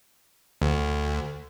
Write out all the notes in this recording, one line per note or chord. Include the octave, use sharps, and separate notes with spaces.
D2